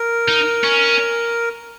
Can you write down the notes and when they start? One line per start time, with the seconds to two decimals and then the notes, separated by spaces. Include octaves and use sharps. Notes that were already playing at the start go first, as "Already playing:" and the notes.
Already playing: A#4
0.28 D#4
0.64 C#4